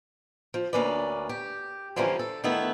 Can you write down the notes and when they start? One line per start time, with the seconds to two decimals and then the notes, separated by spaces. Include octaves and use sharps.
0.54 F3
0.73 D2 A#3 C#4 D4 B4 D5
1.29 G4
1.96 D3 E3 F3 G3 A#3 C#4
2.19 A4
2.44 D#3 E3 A3 B3 E4